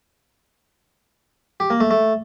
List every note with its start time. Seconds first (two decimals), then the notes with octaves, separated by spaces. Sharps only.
1.60 G4
1.70 A#3
1.80 A3
1.91 A3